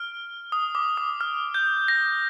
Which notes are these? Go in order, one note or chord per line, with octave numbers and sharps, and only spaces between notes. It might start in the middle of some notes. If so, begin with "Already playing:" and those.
Already playing: F6
D#6
D6
D#6
F6
G6
A#6